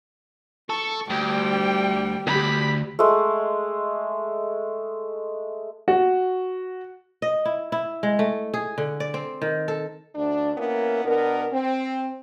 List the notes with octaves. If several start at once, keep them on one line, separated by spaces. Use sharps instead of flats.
A4 C#6
D2 G3 G5
D2 G4 B5
G#3 A3
F#4
D#5
E4
E4
G#3
A3
G#4
D3
D5
C4
D#3
A4
D2 D4
A#3 B3 C#4 E4 A#4
B2 B3 D4 A#4
C4